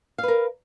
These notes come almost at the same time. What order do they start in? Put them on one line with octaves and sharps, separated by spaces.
F5 B4 A#4